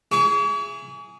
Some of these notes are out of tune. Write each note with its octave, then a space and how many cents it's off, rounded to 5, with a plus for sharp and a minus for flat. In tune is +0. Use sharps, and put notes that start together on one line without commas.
E4 +40 G#4 +0 C#6 +45